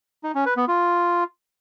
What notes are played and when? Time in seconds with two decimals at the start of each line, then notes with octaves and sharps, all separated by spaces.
0.24 D#4
0.35 C#4
0.46 B4
0.57 B3
0.68 F4